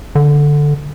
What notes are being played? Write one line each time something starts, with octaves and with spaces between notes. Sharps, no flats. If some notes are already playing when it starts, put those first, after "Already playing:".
D3